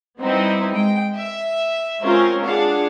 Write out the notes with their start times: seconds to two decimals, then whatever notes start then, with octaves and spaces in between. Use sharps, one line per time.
0.20 G3 B3 C4 D#4 E4
0.72 G#3 G5
1.13 E5
2.02 G#3 C4 C#4 F4 A#4 C5
2.44 D4 F4 G#4 F5 F#5